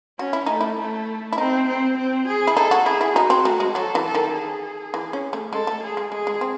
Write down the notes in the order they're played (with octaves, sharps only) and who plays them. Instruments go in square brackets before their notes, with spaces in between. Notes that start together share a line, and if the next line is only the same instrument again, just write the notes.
[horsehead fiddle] C#4 [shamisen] F#4
[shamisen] E4
[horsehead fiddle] A3 [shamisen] D#4
[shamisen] E4
[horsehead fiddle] A3
[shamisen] E4
[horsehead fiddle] C4 [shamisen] D#4
[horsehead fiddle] C4
C4
G#4
[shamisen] E4
[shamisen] D#4 [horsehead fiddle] A4
[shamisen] F#4
[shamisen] E4 [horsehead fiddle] G#4
[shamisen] E4
[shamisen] D#4 [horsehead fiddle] F#4
[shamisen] C4
A3
G#3
[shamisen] F#3 [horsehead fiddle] A4
[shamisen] E3
[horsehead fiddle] A4
[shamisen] D#3
[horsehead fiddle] G#4
[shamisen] E3
C#4
A3
[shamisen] G#3 [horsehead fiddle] A4
[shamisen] A3
[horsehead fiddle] G#4
[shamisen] G#3
[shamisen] G#3 [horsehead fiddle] G#4
[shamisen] G#3
C4